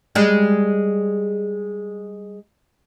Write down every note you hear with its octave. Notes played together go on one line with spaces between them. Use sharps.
G3 G#3